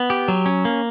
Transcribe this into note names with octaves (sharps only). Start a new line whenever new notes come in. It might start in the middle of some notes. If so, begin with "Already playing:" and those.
Already playing: B3
G4
F#3
C#4
A#3